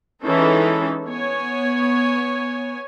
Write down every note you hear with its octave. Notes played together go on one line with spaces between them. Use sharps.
E3 G#3 C#4 D#4 A4
B3 C#5 G#5